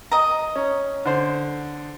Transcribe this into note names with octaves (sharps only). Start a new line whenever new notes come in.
D#5 A#5
C#4
D3 C5